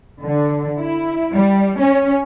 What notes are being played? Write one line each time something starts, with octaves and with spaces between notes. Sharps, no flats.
D3
E4
G3
C#4